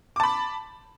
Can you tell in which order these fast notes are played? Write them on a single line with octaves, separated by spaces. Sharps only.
D6 A5 B5